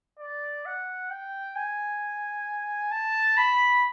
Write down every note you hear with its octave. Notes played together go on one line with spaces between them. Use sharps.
D5
F#5
G5
G#5
A5
B5